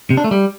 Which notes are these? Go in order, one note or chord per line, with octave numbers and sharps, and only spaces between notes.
C3
D4
A3
G3